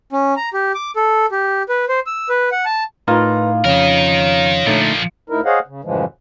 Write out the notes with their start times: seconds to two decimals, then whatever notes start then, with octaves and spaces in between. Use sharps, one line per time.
0.12 C#4
0.37 A#5
0.54 G4
0.75 D6
0.96 A4
1.32 G4
1.69 B4
1.89 C5
2.06 E6
2.29 B4
2.52 F#5
2.65 A5
3.08 A2 D#4 F4 A#4 B4
3.65 F2 C#3 D#4 A#4 C#5
4.66 A#2 D3 F3 A3 D#4
5.30 D2 D#4 E4 A#4
5.45 G#4 C5 C#5 D#5 F5 F#5
5.67 C#3
5.84 F#2 A2 C#3 E3 F3 G#3